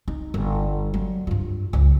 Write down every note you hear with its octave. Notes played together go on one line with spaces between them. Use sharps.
D#4
G1
F#3
G2 F4
C#2